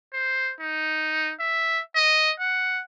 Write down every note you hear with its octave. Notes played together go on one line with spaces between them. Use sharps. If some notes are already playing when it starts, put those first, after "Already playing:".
C5
D#4
E5
D#5
F#5